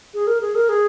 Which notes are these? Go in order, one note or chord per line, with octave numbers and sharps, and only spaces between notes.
G#4
A#4
G#4
A#4
G#4